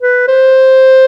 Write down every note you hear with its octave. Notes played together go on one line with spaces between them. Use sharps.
B4
C5